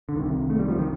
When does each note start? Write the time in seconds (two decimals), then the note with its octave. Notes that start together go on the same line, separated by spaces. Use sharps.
0.09 D3
0.16 C2 C3 D#3
0.50 A3
0.59 G3
0.69 F3
0.79 D#3